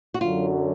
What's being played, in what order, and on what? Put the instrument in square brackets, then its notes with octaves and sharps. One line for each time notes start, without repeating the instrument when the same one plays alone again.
[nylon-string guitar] F#4
[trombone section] F#2 D3 F#3 [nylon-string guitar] F4